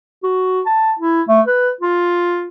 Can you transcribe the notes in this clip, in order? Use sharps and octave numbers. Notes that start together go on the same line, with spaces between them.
F#4
A5
E4
A3
B4
F4